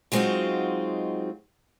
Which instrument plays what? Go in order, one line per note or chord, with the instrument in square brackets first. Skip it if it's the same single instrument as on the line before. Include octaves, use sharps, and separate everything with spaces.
[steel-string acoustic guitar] F#3 G#3 C4 D#4 F4 F#4